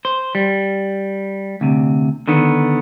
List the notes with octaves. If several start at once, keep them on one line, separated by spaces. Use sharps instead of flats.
C5
G3
D2 C3
D3 D#3 B3